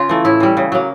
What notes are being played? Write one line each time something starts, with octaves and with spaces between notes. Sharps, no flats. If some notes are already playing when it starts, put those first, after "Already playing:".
Already playing: C#3 F4
E3 A3
A2 E4
E3 G3
C#3
F#3 A#3